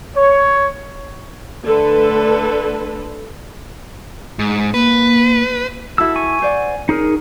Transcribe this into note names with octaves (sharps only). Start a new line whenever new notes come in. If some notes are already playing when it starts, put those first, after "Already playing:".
C#5
D3 A3 A4 B4
G#2
A#3 B4
E4 F#4 A4 E6
G#5 C#6
C5 D5 F#5
C#4 D#4 G#4 A#4